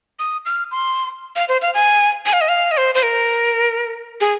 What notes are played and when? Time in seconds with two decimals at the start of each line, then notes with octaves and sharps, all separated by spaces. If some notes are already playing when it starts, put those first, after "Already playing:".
0.19 D#6
0.46 F6
0.71 C6
1.36 F5
1.49 C5
1.62 F5
1.74 G#5
2.26 G#5
2.33 F5
2.41 D#5
2.49 F5
2.71 D#5
2.77 C5
2.95 C5
3.03 A#4
4.21 G#4